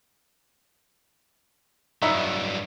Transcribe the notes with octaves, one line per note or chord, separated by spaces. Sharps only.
G2 F#3 D#4 E4 E5